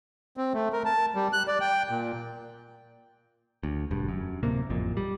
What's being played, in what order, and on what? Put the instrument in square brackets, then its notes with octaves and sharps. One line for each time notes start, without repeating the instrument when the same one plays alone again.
[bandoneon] C4
A3
A#4
A5
G3
F#6
D5
G5
A#2
[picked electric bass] D2
E1 G2
F#2
D1 C3 A#3
A1 F2 A#2
G3